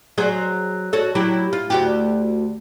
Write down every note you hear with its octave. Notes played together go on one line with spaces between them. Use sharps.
F#3 G#4 C5
F#4 A4 C#5
F#3 E4 G4
F4
D2 F#4 G4